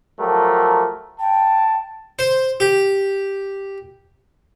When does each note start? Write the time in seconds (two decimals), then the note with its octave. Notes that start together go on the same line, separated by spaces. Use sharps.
0.20 F3 F#3 A3 G4 A#4
1.20 G5 A5
2.19 C5
2.60 G4